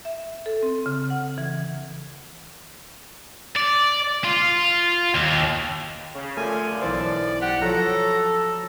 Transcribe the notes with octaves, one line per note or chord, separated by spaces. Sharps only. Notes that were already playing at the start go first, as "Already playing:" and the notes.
E5
A4
C4
C#3
F#5
E3
D5
F4
D#2
C#3
A#2 D3 F3 A3 G#5
B1 E3 C5 D5
G4 F#5
F3 F#3 A4 C#5 A#5